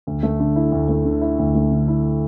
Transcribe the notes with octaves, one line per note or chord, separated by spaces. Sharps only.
D2
A3
D3
E4
D2
A3
D3
E4
D2
A3
D3
E4